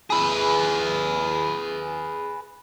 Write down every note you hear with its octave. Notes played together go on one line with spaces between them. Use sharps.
G#4 B4